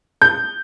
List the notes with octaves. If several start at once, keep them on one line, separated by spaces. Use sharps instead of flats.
G6